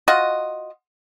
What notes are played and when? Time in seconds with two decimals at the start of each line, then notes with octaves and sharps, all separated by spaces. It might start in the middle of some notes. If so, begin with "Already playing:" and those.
0.08 F4 F#4 D#5